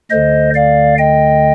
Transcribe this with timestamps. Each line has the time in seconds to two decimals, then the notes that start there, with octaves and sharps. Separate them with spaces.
0.11 D2 D3 C5 D#5
0.55 D5 F5
0.98 D#5 G5